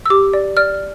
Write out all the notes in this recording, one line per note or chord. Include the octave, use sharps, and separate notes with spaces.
E6
G4 D6
D5
D5 F6